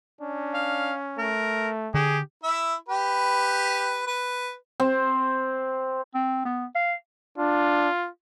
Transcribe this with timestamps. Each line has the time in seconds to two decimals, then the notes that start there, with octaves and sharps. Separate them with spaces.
0.21 C#4 D4
0.54 F5
1.18 A3 A#4
1.94 D3 G4 G#4
2.43 E4 E5
2.89 G4 B4
4.07 B4
4.80 C4
6.14 C4
6.45 B3
6.75 F5
7.38 D4 F4